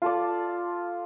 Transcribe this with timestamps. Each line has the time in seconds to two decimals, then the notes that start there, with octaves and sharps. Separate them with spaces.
0.02 F4 A4 D5